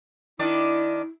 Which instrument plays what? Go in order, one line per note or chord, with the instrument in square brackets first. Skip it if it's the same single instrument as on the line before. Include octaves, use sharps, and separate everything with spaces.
[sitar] D#3 D4 D5 [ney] E4